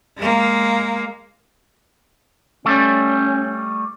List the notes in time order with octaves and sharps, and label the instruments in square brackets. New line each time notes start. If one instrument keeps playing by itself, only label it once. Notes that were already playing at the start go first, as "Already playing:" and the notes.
[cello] G#3 A#3
[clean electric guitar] G3 A3 [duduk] C#4